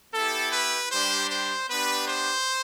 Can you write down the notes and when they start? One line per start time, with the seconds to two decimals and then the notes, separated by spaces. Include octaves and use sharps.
0.14 B3 E4 G4 A4
0.53 B4
0.92 G3 D4 G4 C5
1.30 C5
1.69 B3 D4 G4 B4
2.08 C5